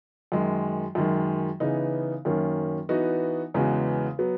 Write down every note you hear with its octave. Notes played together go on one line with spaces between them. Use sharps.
F#2 D#3 G#3
F#2 D#3 G#3
C#3 E3 B3 D#4
F#2 D#3 A#3 C#4
E3 B3 D#4 F#4
E2 C#3 G#3 B3 F#4
F#3 B3